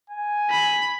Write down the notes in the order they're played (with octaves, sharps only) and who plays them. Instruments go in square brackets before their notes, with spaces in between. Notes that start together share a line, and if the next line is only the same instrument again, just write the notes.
[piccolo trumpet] G#5
[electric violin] B5